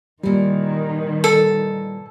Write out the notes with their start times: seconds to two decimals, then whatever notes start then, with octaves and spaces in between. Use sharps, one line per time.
0.23 A#2 D#3 E3 G3
1.24 A4